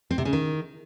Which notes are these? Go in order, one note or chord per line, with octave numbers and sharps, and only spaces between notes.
C4
C3
C#3
D#3